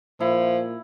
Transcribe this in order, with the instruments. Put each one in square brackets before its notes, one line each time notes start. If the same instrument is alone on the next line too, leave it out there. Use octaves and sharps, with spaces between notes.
[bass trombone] A#2 [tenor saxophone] F3 [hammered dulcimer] E4